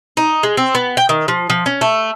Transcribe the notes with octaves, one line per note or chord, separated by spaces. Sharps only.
D#4
G#3
C4
B3
G5
D#3
F3
F3
C#4
A3